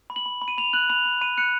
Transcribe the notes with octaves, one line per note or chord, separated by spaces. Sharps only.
B5
F#7
B5
B5
D#7
B5 F7
F#6 F#7
B5 F7
B5
B5 D#7
F#6 C#7